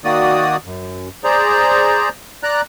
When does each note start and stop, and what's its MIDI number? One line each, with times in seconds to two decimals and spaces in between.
0.05 0.56 51
0.05 0.56 58
0.05 0.56 66
0.05 0.56 74
0.05 0.56 87
0.65 1.09 42
1.24 2.09 68
1.24 2.09 72
1.24 2.09 74
1.24 2.09 82
2.43 2.61 74
2.43 2.61 82
2.43 2.61 90